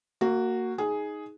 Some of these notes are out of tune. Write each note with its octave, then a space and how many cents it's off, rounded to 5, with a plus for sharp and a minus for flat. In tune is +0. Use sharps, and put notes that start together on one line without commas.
A#3 -20 F#4 +0
D#4 +10 G#4 +5